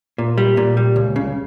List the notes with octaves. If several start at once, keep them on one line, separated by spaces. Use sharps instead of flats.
A#2
G3
A#2
G3
C#2
C#3